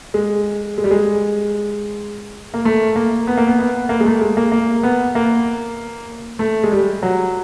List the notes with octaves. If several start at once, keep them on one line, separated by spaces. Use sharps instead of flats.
G#3
G#3
G3
G#3
A#3
A3
A#3
B3
A#3
B3
B3
A#3
G#3
A3
G#3
A#3
A#3
B3
A#3
A3
G#3
G3
F#3